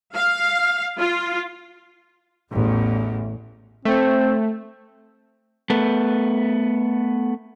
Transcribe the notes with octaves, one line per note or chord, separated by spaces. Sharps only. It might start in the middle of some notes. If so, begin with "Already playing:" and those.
F5
F4
A1 E2
A3 C4
A3 B3